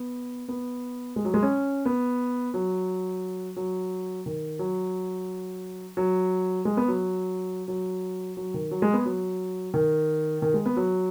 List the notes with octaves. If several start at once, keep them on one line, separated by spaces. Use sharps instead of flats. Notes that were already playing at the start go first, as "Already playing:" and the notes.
Already playing: B3
B3
G#3
F#3
G#3
C#4
B3
F#3
F#3
D#3
F#3
F#3
G#3
B3
F#3
F#3
F#3
D#3
F#3
G#3
B3
F#3
D#3
D#3
G#3
B3
F#3